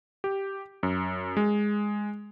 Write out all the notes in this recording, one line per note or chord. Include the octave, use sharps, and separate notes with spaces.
G4
F#2
G#3